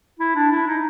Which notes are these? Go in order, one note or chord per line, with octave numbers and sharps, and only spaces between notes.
E4
D4
E4
D#4